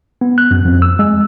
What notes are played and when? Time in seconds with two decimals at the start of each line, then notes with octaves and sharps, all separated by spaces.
0.21 B3
0.38 F#6
0.51 F#2
0.65 F2
0.82 E6
0.99 G#3